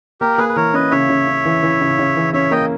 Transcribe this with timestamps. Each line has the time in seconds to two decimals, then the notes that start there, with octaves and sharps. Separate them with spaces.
0.21 A#3 G4 A#4
0.38 A#3 G#4 B4
0.49 B4
0.56 E3 A#4 C#5
0.74 C#4 B4 D#5
0.91 C#3 C#5 E5
1.09 C#3
1.27 C#4
1.45 E3
1.63 E3
1.81 C#3
1.99 C#3
2.16 E3
2.34 C#4 C#5 E5
2.51 A#3 D#5 G5